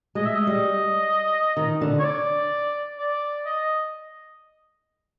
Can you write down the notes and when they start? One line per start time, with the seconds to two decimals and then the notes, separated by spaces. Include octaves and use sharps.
0.15 G#3 D#5
0.25 E5
0.35 D#5
0.47 G3
1.57 D#3
1.81 D3
1.99 C#5
2.04 D5
2.98 D5
3.45 D#5